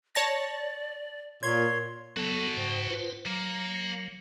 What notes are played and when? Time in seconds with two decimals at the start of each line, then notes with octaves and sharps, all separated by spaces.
0.15 C#5 D5 A5 A#6
1.43 A#2 C#5 C6 G#6
2.17 F#3 B3 F#4 A4 A5
2.57 G#2 C5 G5
2.90 F4 B4 C5
3.26 F#3 A#3